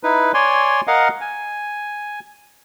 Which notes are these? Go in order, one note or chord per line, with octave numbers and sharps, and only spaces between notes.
D#4 E4 B4
C#5 D5 G#5 C6
A#4 D#5 F5 F#5
G#5